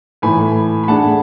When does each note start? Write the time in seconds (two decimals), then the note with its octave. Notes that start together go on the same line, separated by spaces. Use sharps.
0.22 A2 E3 A3 G#5 B5
0.84 B5
0.88 A3 D4 G#4 F#5 A5